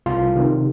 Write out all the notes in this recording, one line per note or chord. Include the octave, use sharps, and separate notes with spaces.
C2 F4
C3 D#3